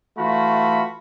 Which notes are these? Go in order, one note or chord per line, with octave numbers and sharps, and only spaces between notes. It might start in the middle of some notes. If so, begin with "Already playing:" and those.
E3 A3 F4 F#4 B5